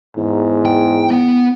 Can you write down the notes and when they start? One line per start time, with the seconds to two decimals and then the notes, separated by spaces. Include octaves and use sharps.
0.17 E2 G#2
0.65 G5
1.11 B3